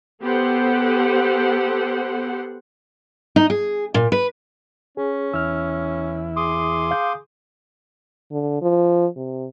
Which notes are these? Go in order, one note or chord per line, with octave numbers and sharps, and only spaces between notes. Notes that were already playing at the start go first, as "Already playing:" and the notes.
B3 G4 A4 C5 F#5
D#4
G#4
A#2
B4
C#4 G#4
E2 E4 E6 F6
G#4 C6 D6 D#6
F5 G6
D3
F3
C3